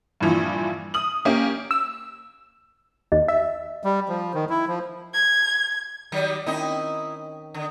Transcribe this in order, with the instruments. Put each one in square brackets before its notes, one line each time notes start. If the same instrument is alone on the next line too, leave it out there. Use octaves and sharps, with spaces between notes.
[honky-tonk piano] G2 A#2 E3 F3
D#6 F#7
A#3 C#4 G4
[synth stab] E6
[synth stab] D#2 [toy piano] D#5
[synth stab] E5
[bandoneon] G3
F3
D#3
E4
F3
[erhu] G#6
[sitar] D#3 F#3 G3
[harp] D#3 C4 C#4 [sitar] D#4 E4 D#5
[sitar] D3